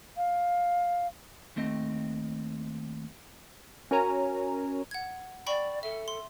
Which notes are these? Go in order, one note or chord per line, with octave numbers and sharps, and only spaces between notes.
F5
D#2 A3 C4 D#5
C#4 F#4 A#4 C#5 G#5 A#5
F#5 G#6
D5 G5 B5 C#6
A4 E5
C6